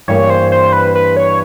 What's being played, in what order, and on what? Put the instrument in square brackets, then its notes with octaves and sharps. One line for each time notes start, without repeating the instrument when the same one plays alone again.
[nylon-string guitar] G2 E3 G3 A#3 [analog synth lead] C#5
[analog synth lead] C5
C5
B4
B4
C#5